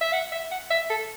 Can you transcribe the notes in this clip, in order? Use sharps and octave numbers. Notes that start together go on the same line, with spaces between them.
E5
F#5
E5
F#5
E5
A4